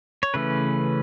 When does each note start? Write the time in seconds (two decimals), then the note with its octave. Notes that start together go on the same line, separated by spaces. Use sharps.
0.23 C#5
0.34 C#3 E3 A3 C#4 B4